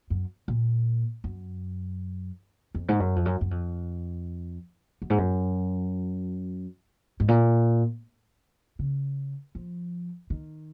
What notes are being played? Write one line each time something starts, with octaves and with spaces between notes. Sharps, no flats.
F#2
A#2
F#2
F2
G#2
F#2
F2
F#2
F#2
F2
F#2
G#2
F#2
G#2
A#2
C#3
F3
D#3